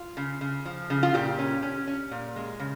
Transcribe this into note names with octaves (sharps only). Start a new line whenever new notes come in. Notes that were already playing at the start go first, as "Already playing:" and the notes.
Already playing: F4
C#3
C#3
F3
C#3
F4
A#2 G4
C#4
C#4
C#4
A#2
G#3
C#3